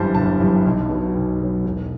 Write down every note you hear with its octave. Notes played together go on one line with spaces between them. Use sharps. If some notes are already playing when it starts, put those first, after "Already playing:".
Already playing: G1 F#2 E3 G3 C5 A5
G1 A5
F#2 E3 G3
B1
B2 F#3
B1
B2 F#3
E1